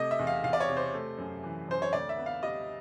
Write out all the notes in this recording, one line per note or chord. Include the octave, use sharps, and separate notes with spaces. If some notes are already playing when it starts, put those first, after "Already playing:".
Already playing: C3 A3 D#5
E5
E2
F5
E2 F5
D5
C#5
C3
C5
A3
F#2
E3
F#2 C5
C#5
D2 D5
E5
B3
F5
G3 D#5